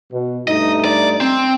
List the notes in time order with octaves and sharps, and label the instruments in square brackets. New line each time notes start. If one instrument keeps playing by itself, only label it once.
[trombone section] B2
[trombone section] G2 A3 D#4 [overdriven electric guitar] D#5
[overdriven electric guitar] D5
C4